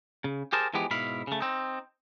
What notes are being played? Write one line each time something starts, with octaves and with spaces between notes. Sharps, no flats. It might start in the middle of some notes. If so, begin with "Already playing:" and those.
C#3
G4 G#4 A#4 C5 A5
E3 F3 G#3 B3 G4
G#2 B2 E4 F5 B5
C#3 A3
C4 D#4